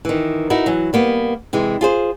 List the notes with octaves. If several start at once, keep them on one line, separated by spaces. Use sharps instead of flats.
D#3 E3
D#4 E4 F#4 A#4
E3 F#3
G3 A#3 B3
C3 E3 G#3
F4 G#4 C5